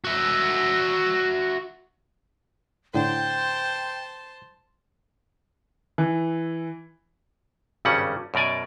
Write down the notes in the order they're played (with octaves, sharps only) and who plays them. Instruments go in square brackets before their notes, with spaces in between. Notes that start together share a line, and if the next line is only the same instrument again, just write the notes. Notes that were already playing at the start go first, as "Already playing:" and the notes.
[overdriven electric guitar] F#4 E5
[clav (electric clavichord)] A2 D3 [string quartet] C5 A5 C6 [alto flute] G5
[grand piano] E3
[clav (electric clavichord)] G#1 G2 C#3 G3 C#4 F#5
F#2 B2 A#4 D5 G#5